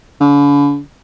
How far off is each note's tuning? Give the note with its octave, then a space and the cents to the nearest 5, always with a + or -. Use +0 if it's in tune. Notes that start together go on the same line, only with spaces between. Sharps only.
D3 -45